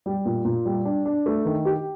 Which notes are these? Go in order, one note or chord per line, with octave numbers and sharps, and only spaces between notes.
G3
A#2
A#2
G3
D4
D4
A3
D#3
G4